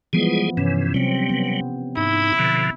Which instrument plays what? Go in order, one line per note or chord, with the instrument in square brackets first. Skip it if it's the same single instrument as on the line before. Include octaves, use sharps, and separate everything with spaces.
[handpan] E3 F3 B3 [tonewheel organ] G3 G#3 G#4
[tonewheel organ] G2 C3 E3 [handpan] C#4
[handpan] C3 C4 [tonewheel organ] F#3 G3
[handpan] B3
[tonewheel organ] G#2 D#4 [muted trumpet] E4
[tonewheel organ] B2 D3 F3